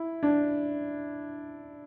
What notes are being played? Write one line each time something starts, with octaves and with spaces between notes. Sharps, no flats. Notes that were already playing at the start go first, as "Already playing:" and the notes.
Already playing: E4
D4